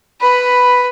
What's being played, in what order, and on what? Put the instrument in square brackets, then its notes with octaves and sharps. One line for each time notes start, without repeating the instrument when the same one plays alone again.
[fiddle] B4 [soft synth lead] B5